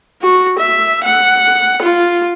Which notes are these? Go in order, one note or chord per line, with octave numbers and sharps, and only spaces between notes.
F#4
E5
F#5
F4